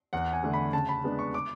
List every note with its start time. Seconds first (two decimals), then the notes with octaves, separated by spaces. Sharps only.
0.13 E2 F#5
0.33 G#5
0.43 D3 A3 D4
0.54 B5
0.73 C#3 A5
0.89 B5
1.04 G#3 B3 D4
1.19 C#6
1.34 D6